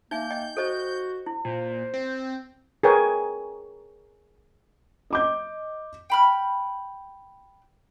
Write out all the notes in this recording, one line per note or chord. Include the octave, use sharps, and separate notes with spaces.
A#3 D#4 E5 G#5 G6
D#5 G5
F#4 A4 C5 D#5
E4
A#2 C5
C4
G#4 A#4 B4 C#5 G5 G#5
D#5 D6 G6
G5 B5 F6